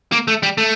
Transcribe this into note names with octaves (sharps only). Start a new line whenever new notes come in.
A#3
A3
G3
A3